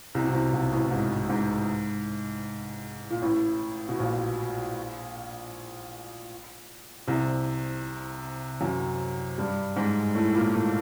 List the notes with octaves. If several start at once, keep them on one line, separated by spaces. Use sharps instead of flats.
C2 C3
B2
C2 C3
B1 B2
A1 A2
G#2
G#2
A#2
A1 A2
B2
A#1 A#2
C2 C3
F#2 F#3
G2 G3
G#2 G#3
A2 A3
A#2 A#3
A2 A3